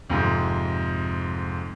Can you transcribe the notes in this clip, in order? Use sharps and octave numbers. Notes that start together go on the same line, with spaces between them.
F2 G#2 C3